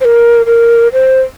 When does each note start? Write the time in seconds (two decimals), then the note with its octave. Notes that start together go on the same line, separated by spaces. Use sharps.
0.01 C5
0.05 A#4
0.46 A#4
0.93 C5